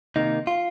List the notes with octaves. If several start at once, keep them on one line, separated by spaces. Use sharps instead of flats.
C3 D#3 A#3 D#4
F4